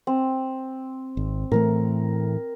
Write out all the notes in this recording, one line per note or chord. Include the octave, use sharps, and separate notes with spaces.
C4
G#1
A2 E3 A3 A#4